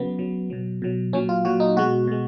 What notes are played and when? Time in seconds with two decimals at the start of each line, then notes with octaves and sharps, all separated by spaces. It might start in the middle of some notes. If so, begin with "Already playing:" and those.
Already playing: C#3 F#3 B3
0.18 C#3 F#3
0.50 B2 F#3
0.82 B2 F#3
1.13 A#2 F#3 C#4
1.29 F4
1.45 A#2 F#3 F#4
1.60 D#4
1.77 B2 G#3 F#4
2.07 B2 G#3